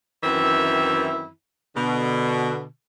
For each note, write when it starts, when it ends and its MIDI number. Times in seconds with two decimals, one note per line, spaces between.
0.23 1.28 42
0.23 1.28 51
0.23 1.28 52
0.23 1.28 60
0.23 1.28 64
0.23 1.28 76
1.76 2.64 47
1.76 2.64 50